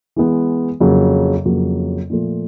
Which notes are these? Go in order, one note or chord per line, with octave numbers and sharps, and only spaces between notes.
E3 G#3 B3
F2 C#3 F#3 A#3
F2 C#3 F#3 A#3
A#2 F3 A3